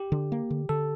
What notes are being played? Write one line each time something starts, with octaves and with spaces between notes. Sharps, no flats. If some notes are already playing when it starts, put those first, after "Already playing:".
Already playing: G4
D3
A#3
D3
D3 A4